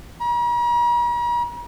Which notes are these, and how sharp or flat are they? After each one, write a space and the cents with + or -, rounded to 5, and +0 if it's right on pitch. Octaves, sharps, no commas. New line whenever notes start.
A#5 +45